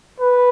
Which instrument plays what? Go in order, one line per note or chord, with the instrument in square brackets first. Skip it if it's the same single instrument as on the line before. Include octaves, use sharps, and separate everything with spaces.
[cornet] B4